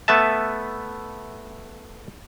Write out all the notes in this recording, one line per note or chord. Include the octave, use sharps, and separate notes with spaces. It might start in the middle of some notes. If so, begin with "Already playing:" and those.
A3 B3 B4 E5 A5